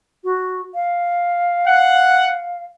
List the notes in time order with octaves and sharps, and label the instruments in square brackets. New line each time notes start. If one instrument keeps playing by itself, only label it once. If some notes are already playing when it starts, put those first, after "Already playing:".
[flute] F#4
F5
[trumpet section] F#5